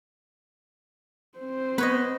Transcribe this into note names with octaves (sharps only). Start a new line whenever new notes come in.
C4 C5
B3 B4 C#5 D#5